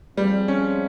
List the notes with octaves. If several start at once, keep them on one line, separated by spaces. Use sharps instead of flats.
F3 G3 G#3 C4
C#4